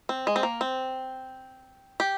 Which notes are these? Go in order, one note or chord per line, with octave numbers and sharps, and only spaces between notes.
C4
G#3
C4
A#3
C4
G4